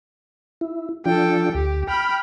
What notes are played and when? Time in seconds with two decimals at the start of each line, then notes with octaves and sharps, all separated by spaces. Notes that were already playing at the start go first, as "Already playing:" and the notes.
0.61 E4
1.06 F3 D4 F4 A4 G5
1.55 D2 G4
1.88 G5 B5 F6